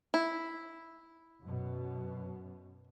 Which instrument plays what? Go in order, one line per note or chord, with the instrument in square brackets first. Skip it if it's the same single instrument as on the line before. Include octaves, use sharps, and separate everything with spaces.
[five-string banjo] E4
[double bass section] F#2 B2